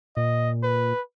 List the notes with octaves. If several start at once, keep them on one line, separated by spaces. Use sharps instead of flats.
A#2 D#5
B4